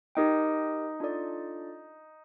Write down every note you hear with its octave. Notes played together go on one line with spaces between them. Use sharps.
D#4 G4 A#4 D#5 G5
D4 F4 A4 D5